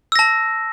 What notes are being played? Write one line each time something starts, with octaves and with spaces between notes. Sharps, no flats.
A5 E6 A#6